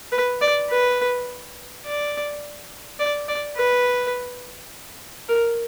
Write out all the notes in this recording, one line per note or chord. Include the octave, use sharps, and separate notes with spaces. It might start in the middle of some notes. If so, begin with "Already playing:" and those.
B4
D5
B4
D5
D5
D5
B4
A#4